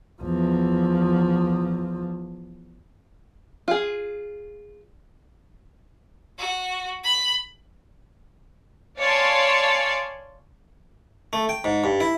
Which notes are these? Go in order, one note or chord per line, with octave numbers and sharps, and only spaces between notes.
E2 F3
F4 G#4
F#4
B5
C#5 D5 F5 G#5 A5 C6
A3
G5
G#2
G2
E4